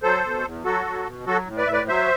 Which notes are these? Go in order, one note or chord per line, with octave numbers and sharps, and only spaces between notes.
F#3 A4 C5
B2
E2
F#3 F#4 A4
F#3
B2
F#3 F#4 A4
A2
B4 D5
A2 E5
B4 D5
F#3 C5 E5